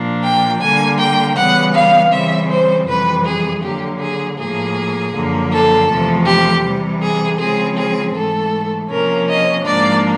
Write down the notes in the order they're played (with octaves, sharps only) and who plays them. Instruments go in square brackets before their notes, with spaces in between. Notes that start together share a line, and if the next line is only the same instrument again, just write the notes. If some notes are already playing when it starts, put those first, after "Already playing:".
Already playing: [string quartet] A#2 F3 A#3 D4
G5
D3 G3 A#3 G#5
G5
C#3 E3 G3 B3 F#5
F5
C#3 E3 G3 C4 E5
C5
F2 C3 E3 G3 B4
G#4
D3 F#3 A#3 G4
G#4
A2 F3 A#3 G#4
F#2 D3 F3 A#3
A4
E2 C3 F3 A3
G4
C3 E3 G3
G#4
C#3 F3 G#3 C4 G#4
G#4
G#2 E3 A3 A4
C3 F3 A#3 C#4 A#4
D#5
G#2 F3 A#3 D4 D5